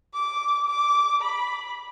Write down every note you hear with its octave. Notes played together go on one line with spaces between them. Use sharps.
D6
D6
B5